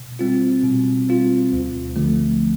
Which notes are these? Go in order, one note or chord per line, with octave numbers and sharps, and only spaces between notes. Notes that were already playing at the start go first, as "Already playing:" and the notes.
Already playing: B2
G3 C4 F4
B2
G3 C4 F4
D2
D3 F3 A3